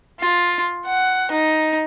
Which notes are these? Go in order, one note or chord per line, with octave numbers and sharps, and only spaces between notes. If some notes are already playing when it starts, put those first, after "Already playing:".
F4
F#5
D#4